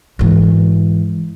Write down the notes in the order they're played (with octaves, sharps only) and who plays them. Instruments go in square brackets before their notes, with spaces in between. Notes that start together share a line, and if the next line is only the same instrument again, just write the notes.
[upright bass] G#2 E3